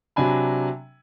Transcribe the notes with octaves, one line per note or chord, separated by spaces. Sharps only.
C3 F#3 D4 G#5 B5